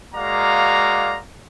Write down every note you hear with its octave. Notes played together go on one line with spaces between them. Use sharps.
G#3 A#3 F#4 D5 F5 A#5